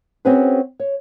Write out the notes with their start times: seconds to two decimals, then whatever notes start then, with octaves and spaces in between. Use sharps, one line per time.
0.25 C4 C#4 F#4 G#4 B4 C5
0.80 C#5